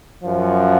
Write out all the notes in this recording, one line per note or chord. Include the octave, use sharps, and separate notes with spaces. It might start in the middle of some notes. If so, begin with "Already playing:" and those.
F#2 F3